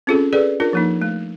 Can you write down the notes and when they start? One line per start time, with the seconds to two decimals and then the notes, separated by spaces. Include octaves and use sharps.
0.07 C4 C#4 F4 G#4 A4
0.33 G#4 A4 B4 D5
0.60 D4 F4 A#4
0.73 F3 A#3 D#4
1.02 A3